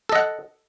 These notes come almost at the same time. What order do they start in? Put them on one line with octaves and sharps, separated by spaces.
A4 D#5 F#5